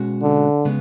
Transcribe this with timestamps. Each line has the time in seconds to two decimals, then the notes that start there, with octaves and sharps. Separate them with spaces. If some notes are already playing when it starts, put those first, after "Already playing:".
Already playing: B2 G#3 C#4 F#4
0.23 D3
0.65 C#3 G#3 B3